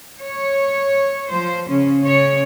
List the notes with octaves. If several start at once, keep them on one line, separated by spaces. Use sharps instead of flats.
C#5
F3 C5
C#3 C#4
C#3 C#5